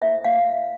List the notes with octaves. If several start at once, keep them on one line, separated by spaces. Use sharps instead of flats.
E4 A4 C5 E5
F5